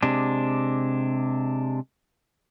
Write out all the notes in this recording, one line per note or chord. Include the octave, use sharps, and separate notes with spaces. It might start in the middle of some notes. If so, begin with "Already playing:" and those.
C3 G#3 D4